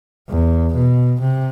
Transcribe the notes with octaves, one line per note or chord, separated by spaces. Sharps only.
E2
B2
C3